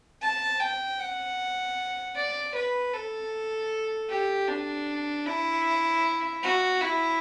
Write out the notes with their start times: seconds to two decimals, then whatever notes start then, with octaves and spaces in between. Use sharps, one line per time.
0.22 A5
0.60 G5
0.99 F#5
2.16 D5
2.55 B4
2.93 A4
4.09 G4
4.48 D4
5.26 E4
6.43 F#4
6.81 E4